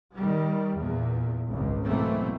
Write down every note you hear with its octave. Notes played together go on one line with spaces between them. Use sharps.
D#3 G3
E2 A#2
G#1 C#2
B2 E3 F#3 A3 A#3 C4